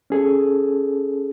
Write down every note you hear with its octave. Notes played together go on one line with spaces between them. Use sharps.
C#4 G#4 A4